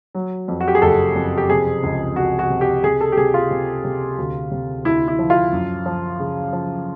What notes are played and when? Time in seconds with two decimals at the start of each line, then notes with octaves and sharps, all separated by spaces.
0.15 F#3
0.48 F2
0.61 F#4
0.68 G4
0.75 G#4
0.82 F#1 A4
1.15 F2
1.38 G4
1.49 C3 G#4
1.83 C#2
2.16 C#2 F#4
2.39 F#4
2.50 C3
2.61 G4
2.83 C3 G#4
3.01 A4
3.12 G4
3.17 C3 G#4
3.34 F4
3.51 C3
3.85 C3
4.18 D2
4.51 C3
4.85 D2 E4
5.08 E4
5.19 F3
5.30 F4
5.52 F#2
5.86 F3
6.20 C#3
6.53 F3